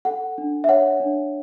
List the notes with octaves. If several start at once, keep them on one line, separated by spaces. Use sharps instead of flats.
A4 F#5
D4
E5
C#5 F#5
D4